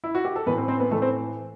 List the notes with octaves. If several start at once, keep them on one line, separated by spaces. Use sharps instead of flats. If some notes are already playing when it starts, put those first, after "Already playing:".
E4
F#4
G4
A4
A2 E3 B3 B4
C4 C5
C4 C5
B3 B4
A2 E3 A3 A4
C4 C5